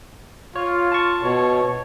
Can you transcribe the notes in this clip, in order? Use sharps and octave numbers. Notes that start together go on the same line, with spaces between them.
F4 C#5
A5 C#6
B2 C#5